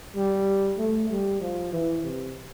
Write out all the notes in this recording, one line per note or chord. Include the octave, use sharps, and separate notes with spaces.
G3
A3
G3
F3
E3
C3